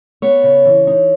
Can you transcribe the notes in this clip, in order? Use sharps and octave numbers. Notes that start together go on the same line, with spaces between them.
B3 C#5
C#3
E3
D#4